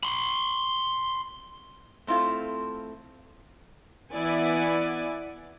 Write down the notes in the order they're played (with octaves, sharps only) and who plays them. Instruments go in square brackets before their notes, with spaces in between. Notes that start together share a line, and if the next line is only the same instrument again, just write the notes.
[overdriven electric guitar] B5 C6
[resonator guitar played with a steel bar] A3 C4 E4 F4 A4
[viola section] E3 B3 E4 D5 F#5 G#5